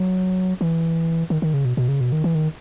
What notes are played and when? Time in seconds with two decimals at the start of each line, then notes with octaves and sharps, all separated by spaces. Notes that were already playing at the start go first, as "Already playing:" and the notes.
Already playing: F#3
0.61 E3
1.30 D#3
1.42 D#3
1.54 C#3
1.65 B2
1.77 B2
1.89 C#3
2.01 B2
2.12 D#3
2.24 E3
2.35 D#3